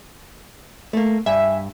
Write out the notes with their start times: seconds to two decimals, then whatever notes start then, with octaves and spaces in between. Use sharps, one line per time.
0.93 A3 A#3
1.26 G2 E5 G#5 E6